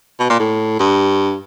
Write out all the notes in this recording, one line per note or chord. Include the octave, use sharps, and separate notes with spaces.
B2
A#2
A2
G2